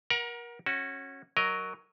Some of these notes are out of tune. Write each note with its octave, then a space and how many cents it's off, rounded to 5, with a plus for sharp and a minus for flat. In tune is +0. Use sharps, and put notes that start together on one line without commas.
A#4 +30 F#5 +0 A#5 +15
C#4 -20 F#4 +0
F#3 +5 A#4 +0 D#5 -10